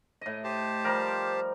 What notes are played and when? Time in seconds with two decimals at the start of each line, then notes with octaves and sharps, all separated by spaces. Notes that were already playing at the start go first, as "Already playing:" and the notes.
0.21 A2 D#5
0.44 G4 C5 A5
0.84 F3 G3 A#4